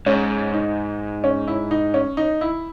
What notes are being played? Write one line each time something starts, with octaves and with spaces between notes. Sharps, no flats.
G#2 C#4
D#4
C#4
E4
D#4
C#4
D#4
E4